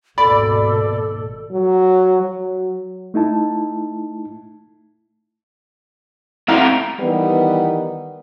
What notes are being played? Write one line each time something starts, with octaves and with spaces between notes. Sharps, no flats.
G#1 D#2 B2 A4 D5 B5
F#3
F#3
A3 D#4 E4 A5
A3 C4 E4 F5 F#5 A#5
D#3 E3 G3 B3